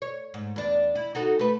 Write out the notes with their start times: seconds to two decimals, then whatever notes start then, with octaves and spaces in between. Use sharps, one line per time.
0.02 C#5
0.34 G#2
0.56 E2 D4
0.95 E4
1.15 D#4 F#4 A4
1.39 A3 B4